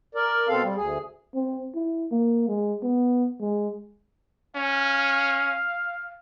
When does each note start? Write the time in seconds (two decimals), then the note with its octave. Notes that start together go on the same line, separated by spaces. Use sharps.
0.15 A#4 D5
0.49 B2 C4 A4 F5
0.63 G3
0.76 D2 G#4
1.35 C4
1.75 E4
2.12 A#3
2.48 G#3
2.83 B3
3.41 G#3
4.56 C#4 F5